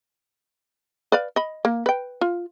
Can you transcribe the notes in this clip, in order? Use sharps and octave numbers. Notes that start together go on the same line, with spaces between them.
B4 D5 F5
D#5 B5
A#3
B4 G5
F4